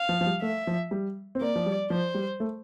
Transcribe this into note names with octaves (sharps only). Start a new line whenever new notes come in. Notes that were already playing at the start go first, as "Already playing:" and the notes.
Already playing: F5
F3
F3
G3
A3 E5
F3
G3
C4
A#3 D5
F3
G3
F3 C5
G3
A3